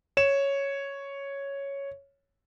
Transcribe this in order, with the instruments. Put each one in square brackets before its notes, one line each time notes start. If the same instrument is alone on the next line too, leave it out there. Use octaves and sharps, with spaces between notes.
[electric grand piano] C#5 E7